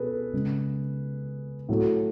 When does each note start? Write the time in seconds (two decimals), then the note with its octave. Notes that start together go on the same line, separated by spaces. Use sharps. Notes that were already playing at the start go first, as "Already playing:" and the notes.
Already playing: B2 G#4 A4 B4
0.33 C#3 G#3
1.69 A2 F#3 A3